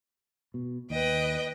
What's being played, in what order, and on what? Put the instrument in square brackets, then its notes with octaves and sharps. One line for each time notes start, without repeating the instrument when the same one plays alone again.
[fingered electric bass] B2
[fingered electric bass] D#2 [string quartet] B4 D#5 G5